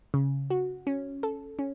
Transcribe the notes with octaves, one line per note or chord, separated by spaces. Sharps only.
C#3
F#4
C#4
A4
C#4